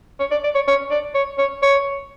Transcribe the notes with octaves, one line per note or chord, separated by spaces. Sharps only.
C#5
D5
D5
C#5
C#5
D5
C#5
C#5
C#5